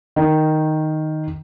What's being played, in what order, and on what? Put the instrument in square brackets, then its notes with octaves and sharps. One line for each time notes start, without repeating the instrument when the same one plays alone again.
[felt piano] D#3